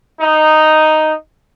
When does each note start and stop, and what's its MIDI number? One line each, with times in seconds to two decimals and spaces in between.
0.21 1.13 63